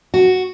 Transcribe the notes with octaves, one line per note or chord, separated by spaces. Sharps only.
F#4